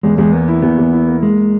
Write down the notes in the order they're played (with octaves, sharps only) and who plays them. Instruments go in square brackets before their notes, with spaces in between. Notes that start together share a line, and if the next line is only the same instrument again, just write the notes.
[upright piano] E2 [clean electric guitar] G#3
[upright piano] E2 [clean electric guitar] G#3
[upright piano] A#3 [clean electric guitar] B3
[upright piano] E4
[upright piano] E2 [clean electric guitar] B3
[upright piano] E2
E4
A#3
[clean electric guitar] G#3 [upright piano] A#3